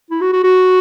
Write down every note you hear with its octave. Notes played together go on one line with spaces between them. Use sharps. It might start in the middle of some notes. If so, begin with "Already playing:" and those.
E4
F#4
F#4
F#4